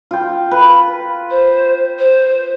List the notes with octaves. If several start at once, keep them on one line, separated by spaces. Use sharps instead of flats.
F4 G5
B4
C5
C5